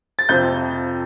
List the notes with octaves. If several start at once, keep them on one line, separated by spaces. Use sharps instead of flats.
A6
F2 C3 F3 G6